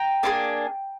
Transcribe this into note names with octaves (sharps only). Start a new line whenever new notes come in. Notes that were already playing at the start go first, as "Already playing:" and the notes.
Already playing: G5 A#5
A#3 D4 F4 G#4